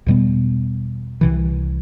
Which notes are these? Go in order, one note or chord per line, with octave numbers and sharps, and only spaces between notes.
E2 B2 G3 B3
C2 C3 E3